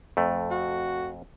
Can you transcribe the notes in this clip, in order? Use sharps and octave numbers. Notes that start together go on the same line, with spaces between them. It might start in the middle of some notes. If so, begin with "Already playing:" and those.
F2 A3
F#4